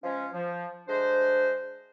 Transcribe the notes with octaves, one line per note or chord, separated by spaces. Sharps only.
F3 G#3 C#4
F3
D2 G#3 D4 C5